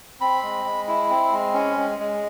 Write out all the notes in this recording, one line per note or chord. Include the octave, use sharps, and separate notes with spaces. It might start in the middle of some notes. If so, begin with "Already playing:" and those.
C4 B5
G#3
G#3
E4
C4
G#3
C#4
G#3
G#3